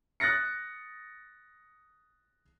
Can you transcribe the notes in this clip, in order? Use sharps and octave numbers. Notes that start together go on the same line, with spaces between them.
D#6 F#6 A6 A#6 C#7